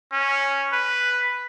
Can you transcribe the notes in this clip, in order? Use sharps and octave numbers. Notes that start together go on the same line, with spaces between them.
C#4
B4